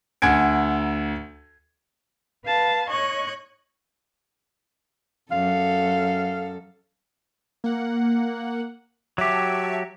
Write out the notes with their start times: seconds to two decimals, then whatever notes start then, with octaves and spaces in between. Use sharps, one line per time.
0.22 D2 F#5 G#5 G#6 D7
2.46 B4 F5 A5
2.90 C#5 D#5 C#6 F#6 G#6
5.32 F#2 A4 F5
7.64 A#3 F#5
9.18 F#3 G4 E5 A5 C#6